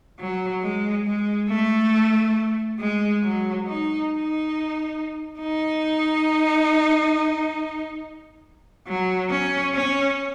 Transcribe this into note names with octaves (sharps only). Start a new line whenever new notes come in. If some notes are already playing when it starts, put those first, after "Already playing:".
F#3
G#3
G#3
A3
G#3
F#3
D#4
D#4
D#4
F#3
C#4
C#4